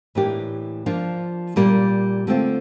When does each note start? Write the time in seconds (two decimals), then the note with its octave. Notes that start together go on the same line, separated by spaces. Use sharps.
0.15 A2 E3 A#3 D4 G4
0.86 F3 A#3 D4 F4
1.56 A#2 G3 A#3
2.27 D3 A3 C4 F4